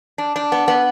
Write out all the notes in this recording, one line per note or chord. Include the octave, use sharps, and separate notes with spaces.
D4
D4
B3
B3